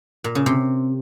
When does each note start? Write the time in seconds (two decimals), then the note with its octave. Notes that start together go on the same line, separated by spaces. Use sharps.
0.24 A#2
0.35 C#3
0.46 C3